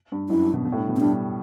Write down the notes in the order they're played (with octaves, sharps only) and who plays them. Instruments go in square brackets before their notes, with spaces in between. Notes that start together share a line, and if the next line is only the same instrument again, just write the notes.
[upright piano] G2
[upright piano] F#2 [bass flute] E4
[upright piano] G2
B2
B2
A2
G2
B2
[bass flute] C4
[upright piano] G3 [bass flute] D4